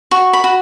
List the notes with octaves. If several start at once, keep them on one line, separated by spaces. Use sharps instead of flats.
F#4 C#6
B5
F#4